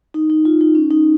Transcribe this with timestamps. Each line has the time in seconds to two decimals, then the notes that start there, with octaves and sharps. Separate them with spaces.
0.14 D#4
0.30 D#4
0.45 F4
0.61 D#4
0.75 C#4
0.91 D#4